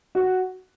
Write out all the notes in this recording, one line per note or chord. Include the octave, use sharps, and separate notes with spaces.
F#4